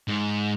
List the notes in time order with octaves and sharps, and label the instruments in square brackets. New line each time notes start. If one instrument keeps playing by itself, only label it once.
[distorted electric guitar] G#2